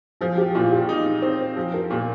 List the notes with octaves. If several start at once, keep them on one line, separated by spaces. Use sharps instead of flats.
F3 G#4
G4
A#2 F4
G4
D#4
C4
F3 G#4
A#4
A#2 A#4